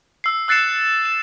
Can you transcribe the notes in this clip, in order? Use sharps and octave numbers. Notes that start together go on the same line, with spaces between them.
E6 C7
E6 F#6 A6 C7 C#7 E7
E7